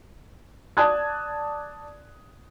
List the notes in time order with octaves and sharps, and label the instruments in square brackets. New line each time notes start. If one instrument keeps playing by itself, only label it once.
[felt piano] D5 A5 D#6 F#6 G#6